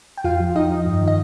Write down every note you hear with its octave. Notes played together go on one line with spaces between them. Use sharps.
G5
F2 F4 F5
F3
F2 D#4 D#5
F3
G2
D#3
D#5